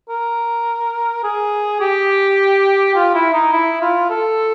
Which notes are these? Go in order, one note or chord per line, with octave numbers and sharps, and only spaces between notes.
A#4
G#4
G4
F4
E4
D#4
E4
F4
A4